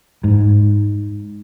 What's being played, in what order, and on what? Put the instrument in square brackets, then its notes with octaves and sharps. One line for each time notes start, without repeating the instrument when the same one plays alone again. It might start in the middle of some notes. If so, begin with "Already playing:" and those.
[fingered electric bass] G#2